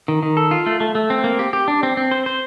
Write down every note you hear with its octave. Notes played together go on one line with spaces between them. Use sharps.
D#3
D#3
A4
F4
A3
A3
A3
C4
A#3
G4
G4
D4
C4
C4
C5
C5